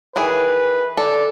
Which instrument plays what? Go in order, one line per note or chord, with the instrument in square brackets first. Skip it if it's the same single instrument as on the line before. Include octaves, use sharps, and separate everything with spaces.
[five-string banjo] D#3 E3 G#4 [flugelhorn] B4
[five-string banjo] A4 [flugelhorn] D5